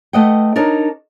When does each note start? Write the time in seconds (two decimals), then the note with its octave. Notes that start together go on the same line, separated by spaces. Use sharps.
0.13 A3 B4 D#5 F#5 G5
0.56 D4 D#4 A#4 C#5